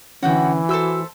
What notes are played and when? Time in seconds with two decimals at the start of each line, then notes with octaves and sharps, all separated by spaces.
0.23 D3 E3 C#4 F#4 F#5 G5
0.69 F#4 A4 C5 E5 E6